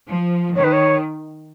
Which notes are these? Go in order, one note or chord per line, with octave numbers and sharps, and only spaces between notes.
F3
D#3 C#5
B4
C#5